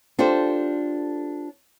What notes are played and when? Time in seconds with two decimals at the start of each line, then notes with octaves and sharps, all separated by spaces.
0.19 D4 F4 G4 A4 C5